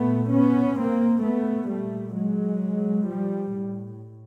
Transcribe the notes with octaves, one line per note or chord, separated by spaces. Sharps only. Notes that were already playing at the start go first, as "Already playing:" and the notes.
Already playing: A#2 A3 B3
B3 C#4
A#3 C4
A3 B3
A#2 G3 A3
F#3 G#3
F3 G3
A2